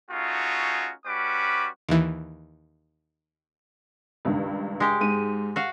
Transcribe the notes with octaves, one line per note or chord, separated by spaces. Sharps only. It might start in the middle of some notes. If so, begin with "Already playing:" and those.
A3 C#4 D#4 F4 F#4 G#4
G3 C#4 F#4 B4 D6
D#2 E3
C#2 G2 D#3
G#3 G4
G#2 D#7
F#4 F5